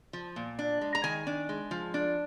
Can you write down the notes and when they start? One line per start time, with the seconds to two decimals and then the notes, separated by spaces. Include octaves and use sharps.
0.13 F3
0.36 A#2
0.59 D4
0.81 G#3
0.95 A#5
1.04 D#3 G#5
1.27 D4
1.49 G#3
1.71 F3
1.94 D4